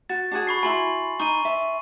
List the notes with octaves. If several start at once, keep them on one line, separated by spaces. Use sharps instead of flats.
F#4 A6
D4 F#4 G#4
B5 C#6 C7
E4 F#4 G#5 B5 C6 F#7
D#4 C#6 D#7
E5